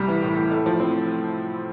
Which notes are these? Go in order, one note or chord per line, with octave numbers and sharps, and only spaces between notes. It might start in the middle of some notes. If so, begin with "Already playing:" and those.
Already playing: C2 G3
E3
A2
A2
A3
F3
C4